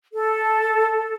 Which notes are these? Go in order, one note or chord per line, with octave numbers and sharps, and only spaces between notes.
A4